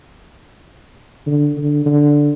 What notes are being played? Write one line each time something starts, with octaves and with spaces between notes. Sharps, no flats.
D3
D3
D3